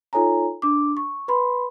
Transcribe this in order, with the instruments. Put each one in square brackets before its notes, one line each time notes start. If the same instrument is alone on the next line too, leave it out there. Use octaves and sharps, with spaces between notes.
[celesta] D#4 F4 A4 C#5 G#5 A#5
D4 D6
C#6
B4 B5 C6